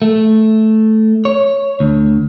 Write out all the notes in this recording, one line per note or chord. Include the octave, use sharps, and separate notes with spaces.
A3
C#5
D2